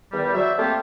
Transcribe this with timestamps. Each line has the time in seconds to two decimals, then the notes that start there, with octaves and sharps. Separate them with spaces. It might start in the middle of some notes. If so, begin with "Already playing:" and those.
0.12 E2 D#3 G3
0.34 F#3 C5 D5 E5
0.58 A3 A#3 C4 F4 G4